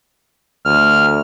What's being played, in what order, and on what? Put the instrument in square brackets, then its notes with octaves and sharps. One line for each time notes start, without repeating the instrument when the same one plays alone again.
[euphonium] D2 [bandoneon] F6